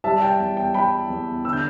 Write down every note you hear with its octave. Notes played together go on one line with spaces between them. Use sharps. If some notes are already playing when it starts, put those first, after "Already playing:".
G3 E5 A5
G5
E2
G5
G3 G5 B5
E2
D3 E6
G6